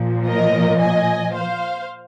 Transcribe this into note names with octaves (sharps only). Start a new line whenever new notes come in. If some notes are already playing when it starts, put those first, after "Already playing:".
Already playing: A#2 F3
A#4 D#5
D#5 G#5
C5 F5